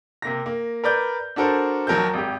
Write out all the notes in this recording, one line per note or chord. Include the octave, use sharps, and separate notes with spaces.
C3 A#3 A#6
A#3
A#4 B4 D5 G6
D4 F#4 A4 A#4 C5
D#2 F#3 A#4 A5 G6
G#1 G4